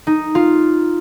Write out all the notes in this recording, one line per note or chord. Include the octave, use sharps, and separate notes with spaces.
D#4
F4